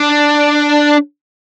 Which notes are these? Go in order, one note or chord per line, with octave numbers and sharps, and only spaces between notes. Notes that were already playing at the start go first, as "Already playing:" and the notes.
Already playing: D4